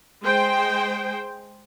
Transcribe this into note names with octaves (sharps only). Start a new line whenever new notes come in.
G#3 C5 G5